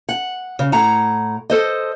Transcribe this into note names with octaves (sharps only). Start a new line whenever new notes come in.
F#5
C#3
A2 F#5 A#5
A4 C5 D#5